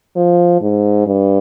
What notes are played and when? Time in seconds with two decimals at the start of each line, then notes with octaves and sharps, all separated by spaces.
0.16 F3
0.61 G#2
1.07 G2